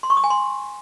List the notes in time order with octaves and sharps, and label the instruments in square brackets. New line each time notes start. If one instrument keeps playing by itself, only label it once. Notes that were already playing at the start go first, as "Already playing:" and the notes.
[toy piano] C6
C#6
D#6
G#5
C6